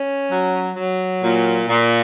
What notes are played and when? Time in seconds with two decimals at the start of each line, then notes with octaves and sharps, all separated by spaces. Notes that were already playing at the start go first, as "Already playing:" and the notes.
Already playing: C#4
0.30 F#3
0.76 F#3
1.22 A#2
1.69 A#2